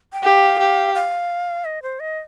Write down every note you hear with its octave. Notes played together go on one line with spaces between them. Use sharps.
G5
G4 F5
G4
F5
D#5
C5
D#5